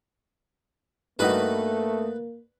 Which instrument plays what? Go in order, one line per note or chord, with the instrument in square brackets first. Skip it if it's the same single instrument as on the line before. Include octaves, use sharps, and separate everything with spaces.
[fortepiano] G2 D#4 F#4 [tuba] A3 [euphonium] A#3 [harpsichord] B4